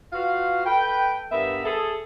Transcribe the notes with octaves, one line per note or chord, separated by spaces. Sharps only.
F4 F#4 B4 F5
A4 B4 G5
G2 B3 A#4 E5
G#4 A4